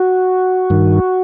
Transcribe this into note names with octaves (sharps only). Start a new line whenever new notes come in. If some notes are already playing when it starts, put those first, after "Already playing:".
Already playing: F#4
G2 D#3